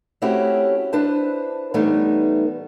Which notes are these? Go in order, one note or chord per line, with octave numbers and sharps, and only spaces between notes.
A3 C4 C#4 E4 F#4 G4
D4 E4 B4 C5 A5
A2 E3 G3 A3 B3 D#4